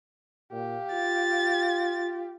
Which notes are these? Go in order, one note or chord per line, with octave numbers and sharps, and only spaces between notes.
A#2 G4 F5
F4 A6